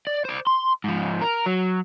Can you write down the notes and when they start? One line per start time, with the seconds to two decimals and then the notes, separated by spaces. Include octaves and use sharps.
0.07 D5
0.25 C5 D5
0.47 C6
0.84 G#2 F3
1.22 A#4
1.46 F#3